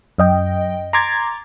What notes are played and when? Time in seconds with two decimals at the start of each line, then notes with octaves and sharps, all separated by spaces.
0.18 F#2 D#5 G5
0.93 A#5 C6 D6 G#6 A6